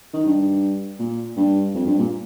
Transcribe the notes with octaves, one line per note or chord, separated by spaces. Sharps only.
D#3
G2
A#2
G2
F2
G2
A#2